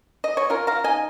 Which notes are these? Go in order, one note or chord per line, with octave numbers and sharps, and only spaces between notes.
D#5
C#5
C#4 F4 A#4
F5 A#5
D#3 D#5 G#5